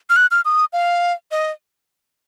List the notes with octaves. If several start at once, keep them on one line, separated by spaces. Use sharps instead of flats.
F6
F#6
F6
D#6
F5
D#5